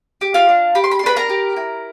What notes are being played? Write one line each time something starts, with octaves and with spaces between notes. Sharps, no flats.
G4
F4 F5
D4
G4 B5
C6
B5
C6
D4 B4 B5
A#4 A#5
G4
E4